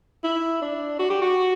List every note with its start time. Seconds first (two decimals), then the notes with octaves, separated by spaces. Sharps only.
0.24 E4
0.62 D4
0.99 F#4
1.10 G4
1.22 F#4